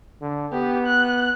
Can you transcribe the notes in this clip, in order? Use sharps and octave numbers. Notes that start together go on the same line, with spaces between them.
D3
B3 G4
F#6